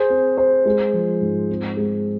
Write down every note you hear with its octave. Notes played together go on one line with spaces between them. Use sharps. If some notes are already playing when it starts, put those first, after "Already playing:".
Already playing: G#4 C5
C4
C5
G#3
F3
G#2
C4
G#3